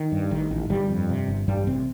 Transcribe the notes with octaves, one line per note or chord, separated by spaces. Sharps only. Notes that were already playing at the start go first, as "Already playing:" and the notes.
Already playing: D#3
G2
A1 D#3
A1
G1 G2 G3
F2
C3
G1
A1 G2 G3
A1 C3 C4